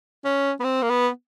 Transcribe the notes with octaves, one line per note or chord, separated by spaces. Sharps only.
C#4
B3
C4
A#3
B3